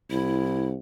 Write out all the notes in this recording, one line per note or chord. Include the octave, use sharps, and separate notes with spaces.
C2 E4